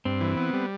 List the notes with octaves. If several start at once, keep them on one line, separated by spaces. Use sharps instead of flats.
G2 C4
E3
B3
G3